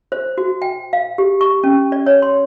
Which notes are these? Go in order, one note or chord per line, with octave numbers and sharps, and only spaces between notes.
C5
F#4
G5
F5
G4
C#6
C#4
D5
C#5
C6